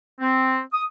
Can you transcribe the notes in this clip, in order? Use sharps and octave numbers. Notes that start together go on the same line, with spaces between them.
C4
D#6